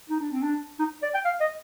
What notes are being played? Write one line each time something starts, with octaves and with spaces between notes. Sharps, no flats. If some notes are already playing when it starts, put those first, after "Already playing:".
D#4
D4
C4
D4
D#4
D5
G5
F5
D#5